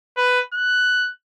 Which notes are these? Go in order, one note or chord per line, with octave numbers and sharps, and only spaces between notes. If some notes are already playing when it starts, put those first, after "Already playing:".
B4
F#6